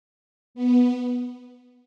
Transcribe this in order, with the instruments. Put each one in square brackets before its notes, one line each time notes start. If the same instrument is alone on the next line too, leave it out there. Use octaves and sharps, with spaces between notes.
[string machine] B3